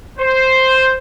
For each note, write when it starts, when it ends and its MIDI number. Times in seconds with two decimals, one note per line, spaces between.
0.18 0.98 72